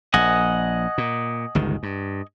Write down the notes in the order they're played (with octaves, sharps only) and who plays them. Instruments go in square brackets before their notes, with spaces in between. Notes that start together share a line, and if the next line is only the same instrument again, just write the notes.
[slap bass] A#1 [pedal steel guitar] D#5 F#5 G#5
[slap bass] A#2
G1 C#2 D#3
G2